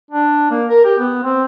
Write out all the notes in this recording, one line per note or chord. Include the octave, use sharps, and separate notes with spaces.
D4
A#3
A#4
G4
B3
C4